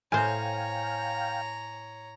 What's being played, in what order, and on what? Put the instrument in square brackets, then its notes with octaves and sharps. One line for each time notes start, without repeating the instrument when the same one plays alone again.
[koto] A2 C5 [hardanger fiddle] C#5 A#5 [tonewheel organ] F5 G5 [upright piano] G#5